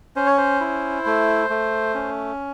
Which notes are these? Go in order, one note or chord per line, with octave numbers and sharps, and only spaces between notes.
C#4 C5
C#5
C5
E4
A3
A3
C#4